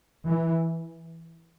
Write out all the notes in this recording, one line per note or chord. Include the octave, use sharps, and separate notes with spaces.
E3